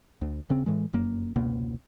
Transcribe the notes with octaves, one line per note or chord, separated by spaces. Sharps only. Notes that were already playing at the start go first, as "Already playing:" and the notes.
D2
D#1 C#3 C4
A2 E3 G#3
F1 F#2 A#3
F1 C#2 B2 A#3